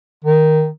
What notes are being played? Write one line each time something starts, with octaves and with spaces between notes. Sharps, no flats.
D#3